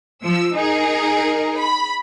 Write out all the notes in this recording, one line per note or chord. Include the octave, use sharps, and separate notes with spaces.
F3 E6
D#4 G#4 A#4
B5